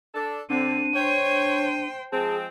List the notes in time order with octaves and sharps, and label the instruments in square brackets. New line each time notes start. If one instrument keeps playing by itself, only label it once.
[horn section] D4 A4
[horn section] D3 [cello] C4 [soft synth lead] D4 [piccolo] D#7
[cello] C5 G5 [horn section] C#5
[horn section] F3 G#3 C4 [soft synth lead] G#4 [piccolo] A5